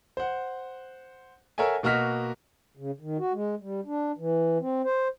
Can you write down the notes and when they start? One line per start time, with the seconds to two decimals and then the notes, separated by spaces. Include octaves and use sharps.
0.17 C5 F#5
1.58 A4 A#4 C#5 E5 F#5 G#5
1.83 B2 A#3 F#4 D#5 F6 B6
2.77 C#3
3.01 D#3
3.19 F#4
3.33 G#3
3.60 G3
3.86 D4
4.18 E3
4.60 C4
4.84 C5